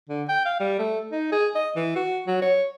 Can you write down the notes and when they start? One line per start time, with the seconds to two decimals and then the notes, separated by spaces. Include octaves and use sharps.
0.09 D3
0.29 G5
0.45 F5
0.60 G3
0.78 A3
1.12 D#4
1.32 G#4
1.55 D#5
1.76 E3
1.96 F#4
2.26 F#3
2.42 C#5